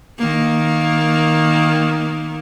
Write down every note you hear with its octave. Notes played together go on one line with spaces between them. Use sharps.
D#3 A#3